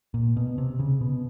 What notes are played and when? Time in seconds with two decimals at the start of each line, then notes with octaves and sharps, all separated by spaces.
0.14 A#2
0.37 B2
0.58 C3
0.79 C#3
1.01 B2